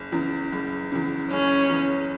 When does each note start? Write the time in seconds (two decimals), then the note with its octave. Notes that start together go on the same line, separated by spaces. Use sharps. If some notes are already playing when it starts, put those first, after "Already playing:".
Already playing: F#1
0.12 E2 C#3
0.52 F#1
0.92 E2 C#3
1.31 F#1 C#4
1.70 E2 C#3